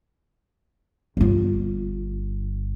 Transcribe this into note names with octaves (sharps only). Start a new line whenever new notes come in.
G1 F4